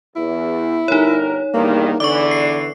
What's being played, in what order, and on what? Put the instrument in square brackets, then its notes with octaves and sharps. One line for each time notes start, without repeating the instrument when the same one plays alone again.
[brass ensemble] E2 [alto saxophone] E4
[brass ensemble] G1 A#4 [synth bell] D#4 C#5
[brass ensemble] E2 G2 D#3 [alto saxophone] A#3
[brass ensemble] E2 D3 E3 [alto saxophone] D5 [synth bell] C#6 D6
[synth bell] C7